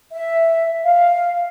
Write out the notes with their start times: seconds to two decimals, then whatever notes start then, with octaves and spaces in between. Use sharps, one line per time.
0.12 E5
0.84 F5